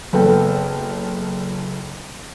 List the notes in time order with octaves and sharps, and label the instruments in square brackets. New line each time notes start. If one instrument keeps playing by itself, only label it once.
[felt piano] F#1 B3 A4 G5